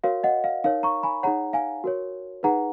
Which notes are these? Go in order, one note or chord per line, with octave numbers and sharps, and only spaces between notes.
F#4 A#4 C#5 F5
D#5 F#5
F5
D#4 A#4 C#5 F5
A#5 C#6
G#5 B5
D#4 G#4 C#5 F#5 A#5
F5 G#5
F#4 A#4 C#5
D#4 G#4 B4 F#5 A#5